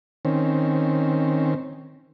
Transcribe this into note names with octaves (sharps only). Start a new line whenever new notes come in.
D#3 C4 C#4